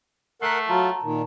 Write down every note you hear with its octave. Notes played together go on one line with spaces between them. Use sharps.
A3 A#4 F#5 B6 C7
F#3 F4 A5 A#5
A#2 D#3